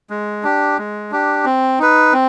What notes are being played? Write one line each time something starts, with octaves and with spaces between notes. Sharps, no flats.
G#3
D4 G4
G#3
D4 G4
C4
D#4 B4
C4